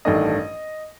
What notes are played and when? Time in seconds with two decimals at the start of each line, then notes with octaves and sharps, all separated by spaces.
0.05 A1 G2 D#3 A3 D4 D#5